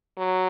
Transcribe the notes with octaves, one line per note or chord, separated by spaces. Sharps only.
F#3